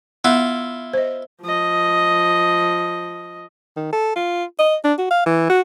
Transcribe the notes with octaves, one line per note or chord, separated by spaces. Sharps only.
B3 E4 F4
C5 D#5
F3 D#5
D#3
A4
F4
D#5
D4
F#4
F5
E3
F#4